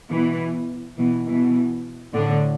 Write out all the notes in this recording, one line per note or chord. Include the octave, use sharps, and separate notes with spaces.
B2 E3
B2 E3
B2 E3
A2 D3